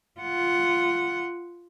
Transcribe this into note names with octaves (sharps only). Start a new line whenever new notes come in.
F4 F#5